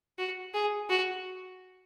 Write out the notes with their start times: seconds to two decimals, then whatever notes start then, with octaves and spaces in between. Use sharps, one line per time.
0.18 F#4
0.54 G#4
0.89 F#4